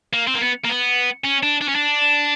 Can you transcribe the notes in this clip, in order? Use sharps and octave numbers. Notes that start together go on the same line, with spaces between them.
A#3
C4
A#3
B3
A#3
B3
C#4
D4
D4
C#4
D4